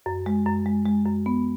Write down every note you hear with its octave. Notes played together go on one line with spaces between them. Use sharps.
F#2
G#3
F#2
G#3
G#3
F#2
B3